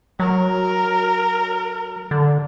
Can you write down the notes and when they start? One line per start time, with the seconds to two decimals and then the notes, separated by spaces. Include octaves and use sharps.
0.20 F#3 A#4
2.11 D3